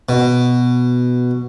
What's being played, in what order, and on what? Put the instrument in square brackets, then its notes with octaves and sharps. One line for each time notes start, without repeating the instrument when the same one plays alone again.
[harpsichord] B2